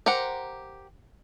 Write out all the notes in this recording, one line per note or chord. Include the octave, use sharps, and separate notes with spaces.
G4 A#4 C5 F#5